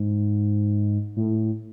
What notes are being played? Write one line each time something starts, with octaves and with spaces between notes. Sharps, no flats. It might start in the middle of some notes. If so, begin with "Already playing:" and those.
Already playing: G#2
A2